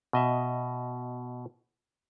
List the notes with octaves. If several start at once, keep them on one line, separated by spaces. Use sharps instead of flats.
B2 D#5 E5